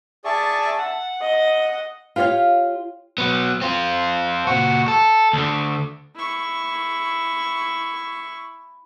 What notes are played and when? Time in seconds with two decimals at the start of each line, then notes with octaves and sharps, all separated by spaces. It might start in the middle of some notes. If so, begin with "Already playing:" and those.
0.25 G#4 D5 E5 A5 C#6
0.78 F#5
1.21 D#5
2.16 F4 G4 C#5 D5 F5
3.18 F#3 B3
3.62 C4 F4
4.47 A#2 F#4
4.88 A4
5.33 D2 D3
6.16 E4 C#6